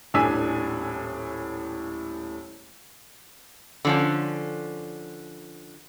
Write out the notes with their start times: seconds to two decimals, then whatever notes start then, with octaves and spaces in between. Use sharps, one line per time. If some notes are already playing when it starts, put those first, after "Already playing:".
0.14 D#1 A2 D4 G#5 E6 B6
3.85 D3 F3 C#4